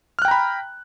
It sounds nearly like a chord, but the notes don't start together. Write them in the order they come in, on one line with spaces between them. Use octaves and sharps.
F6 F#6 G5 A#5 B5